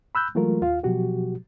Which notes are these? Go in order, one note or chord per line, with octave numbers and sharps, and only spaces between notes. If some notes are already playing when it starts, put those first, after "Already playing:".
B5 E6 F#6 G6
E3 F#3 G#3 A3 F4 A#4
D#2 F4 F5
B2 F3 F#3 F#4 G4